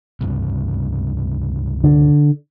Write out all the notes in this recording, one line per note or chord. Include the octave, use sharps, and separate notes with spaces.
C#2 G2 C3
D3